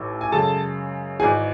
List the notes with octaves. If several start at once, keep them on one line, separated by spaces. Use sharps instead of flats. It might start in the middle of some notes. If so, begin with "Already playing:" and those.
Already playing: A1 A2 D#4
G#5
F#2 C#3 G#3 A4 A5
G#1 G#2 E3 G#4 G#5